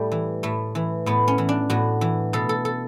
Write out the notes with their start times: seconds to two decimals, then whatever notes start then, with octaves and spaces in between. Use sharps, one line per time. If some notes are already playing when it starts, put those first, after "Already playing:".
Already playing: A2 G3 A3
0.12 E3
0.43 A2 A3
0.75 E3
1.06 A2 B3
1.28 C#4
1.38 E3
1.49 D4
1.70 A2 F#4
2.01 E3
2.33 B2 A4
2.49 A4
2.65 A4